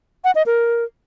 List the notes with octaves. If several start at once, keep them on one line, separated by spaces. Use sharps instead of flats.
F#5
D#5
A#4